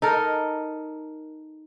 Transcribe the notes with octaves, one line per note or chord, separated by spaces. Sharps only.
D#4 A4 A#4